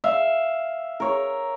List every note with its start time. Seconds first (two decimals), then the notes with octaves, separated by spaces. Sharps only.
0.04 E5 F5
1.00 A#4 C#5